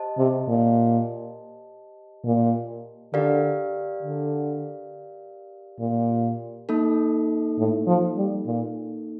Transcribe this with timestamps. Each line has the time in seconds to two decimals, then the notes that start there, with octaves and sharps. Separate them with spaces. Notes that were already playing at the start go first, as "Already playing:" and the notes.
Already playing: G4 C5 D#5 A5
0.18 C3
0.48 A#2
2.25 A#2
3.14 D3 G4 A#4 D5 F5
4.02 D3
5.80 A#2
6.69 A#3 D#4 A4
7.59 A2
7.87 F3
8.17 G3
8.47 A#2